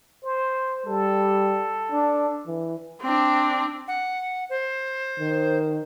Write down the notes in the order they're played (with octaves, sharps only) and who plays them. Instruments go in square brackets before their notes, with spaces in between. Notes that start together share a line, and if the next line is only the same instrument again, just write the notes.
[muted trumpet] C5
[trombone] G3 [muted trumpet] A4
[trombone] D4
E3
[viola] C4 D4
[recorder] F#5
C5
[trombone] D#3